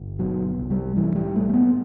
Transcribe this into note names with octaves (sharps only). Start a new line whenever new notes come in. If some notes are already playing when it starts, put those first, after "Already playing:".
Already playing: G1
B2 F#3
C2
G3
A2 E3
G3
B1 A3
A3
B3